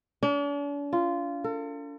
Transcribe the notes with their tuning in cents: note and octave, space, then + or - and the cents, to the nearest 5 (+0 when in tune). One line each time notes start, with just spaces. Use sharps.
D4 -45
F4 -15
A4 +40